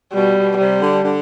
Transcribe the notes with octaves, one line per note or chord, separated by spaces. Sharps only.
B2 G3
B2
C3 G3
D3
D3